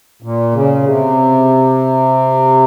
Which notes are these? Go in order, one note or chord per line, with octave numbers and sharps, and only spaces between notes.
A#2
C#3
C3